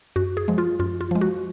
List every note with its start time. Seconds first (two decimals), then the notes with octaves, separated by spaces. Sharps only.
0.16 F#2 F#4
0.37 G#4
0.48 F3 G#3
0.58 F4
0.80 F#2 F4
1.01 F4
1.11 F3 G#3
1.21 F#4